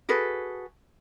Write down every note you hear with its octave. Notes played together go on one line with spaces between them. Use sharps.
F#4 G#4 A4 B4